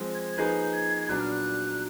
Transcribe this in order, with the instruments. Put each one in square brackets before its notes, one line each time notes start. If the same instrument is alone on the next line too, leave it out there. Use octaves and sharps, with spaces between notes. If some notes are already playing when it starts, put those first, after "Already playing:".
Already playing: [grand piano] F3 G#3 C4
[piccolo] G#6
[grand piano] F3 A#3 D#4 G#4 B4 [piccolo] G6
[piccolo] G#6
[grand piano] A#2 F#3 B3 D4 [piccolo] F#6
[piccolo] F6
F#6